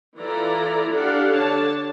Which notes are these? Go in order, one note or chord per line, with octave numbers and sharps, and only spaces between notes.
E3 E4 F4 A4 D5 A#5
D4 G4 A4 D5 F5 F#5
D3 D4 C#5 A5